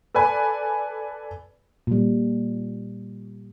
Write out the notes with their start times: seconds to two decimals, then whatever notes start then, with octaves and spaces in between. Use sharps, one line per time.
0.15 A4 B4 D5 G#5 B5
1.87 A#2 G3